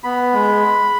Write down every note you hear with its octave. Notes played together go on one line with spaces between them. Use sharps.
B3 B5
G#3